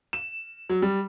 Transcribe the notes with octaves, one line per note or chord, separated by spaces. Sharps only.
E7
F#3
G3